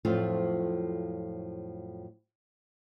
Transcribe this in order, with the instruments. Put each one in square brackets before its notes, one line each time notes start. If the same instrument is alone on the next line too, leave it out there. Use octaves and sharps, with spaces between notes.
[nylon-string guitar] F2 A2 F3 F#3 A3 F4